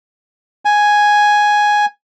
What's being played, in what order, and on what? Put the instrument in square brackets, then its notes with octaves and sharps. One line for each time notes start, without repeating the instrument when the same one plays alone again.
[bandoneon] G#5